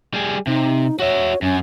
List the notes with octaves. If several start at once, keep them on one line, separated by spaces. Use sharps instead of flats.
G3 G#4
C3 D#4
F#4 C#5 E5
F#2 C#4